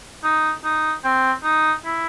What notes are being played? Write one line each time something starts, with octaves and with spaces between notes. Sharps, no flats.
D#4
D#4
C4
D#4
E4